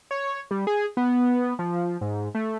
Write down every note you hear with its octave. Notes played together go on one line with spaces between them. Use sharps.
C#5
G3
G#4
B3
F3
G#2
A3